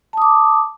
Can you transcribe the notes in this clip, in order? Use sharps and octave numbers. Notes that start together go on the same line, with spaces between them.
A5 D6 D#6